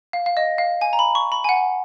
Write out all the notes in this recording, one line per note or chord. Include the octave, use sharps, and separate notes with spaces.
F5
F5
D#5
F5
G#5
A#5
B5
C#6
B5
G#5
F#5